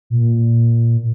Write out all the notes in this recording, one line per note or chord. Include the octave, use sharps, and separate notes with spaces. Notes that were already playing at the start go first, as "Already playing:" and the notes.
A#2